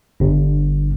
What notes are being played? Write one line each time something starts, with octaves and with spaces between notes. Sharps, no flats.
G1